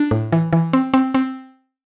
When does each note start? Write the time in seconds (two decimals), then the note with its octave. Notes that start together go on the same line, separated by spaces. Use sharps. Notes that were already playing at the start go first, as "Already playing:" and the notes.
Already playing: D4
0.11 A2
0.32 E3
0.53 E3
0.73 C4
0.94 C4
1.14 C4